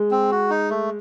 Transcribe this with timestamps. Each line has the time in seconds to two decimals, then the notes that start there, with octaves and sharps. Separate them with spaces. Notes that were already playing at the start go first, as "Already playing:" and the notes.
Already playing: G#3
0.11 C4
0.31 F#4
0.50 D#4
0.70 A3